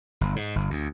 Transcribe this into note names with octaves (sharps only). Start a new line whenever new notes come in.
G1
G#2
G1
D2